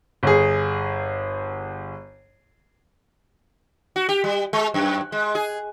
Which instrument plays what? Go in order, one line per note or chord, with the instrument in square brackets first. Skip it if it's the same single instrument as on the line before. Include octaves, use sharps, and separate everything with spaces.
[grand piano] G1 G#4
[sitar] F#4
G4
G3
G#3
F#2
G#3
G#4